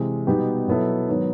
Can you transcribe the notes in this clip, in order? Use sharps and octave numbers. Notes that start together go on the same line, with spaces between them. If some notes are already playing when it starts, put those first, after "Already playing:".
Already playing: C3 E3 G#3
B2 G3 B3 D#4 G4
B2 F#3 B3 E4 A4
G#2 D#3 F#3 B3